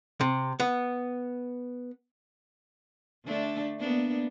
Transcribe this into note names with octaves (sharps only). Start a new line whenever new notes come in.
C3
B3
D3 A3 D4
A#3 B3 D4